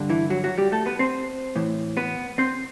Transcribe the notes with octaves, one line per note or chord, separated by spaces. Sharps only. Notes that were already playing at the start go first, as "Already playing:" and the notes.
Already playing: G2 D3
E3 E4
F#3 F#4
F#3 F#4
G3 G4
A3 A4
B3 B4
C4 C5
A2 E3
B3 B4
C4 C5